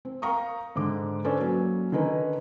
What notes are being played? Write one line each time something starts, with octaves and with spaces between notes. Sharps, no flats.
C4
A#4 F5 G5 A#5 C#6 D#6
G#2 D3 D6
C#4 D4 A4 B4 C5 D5
F#3 A#3 C#4
D3 D#3 C#4 D#4 A#4 B4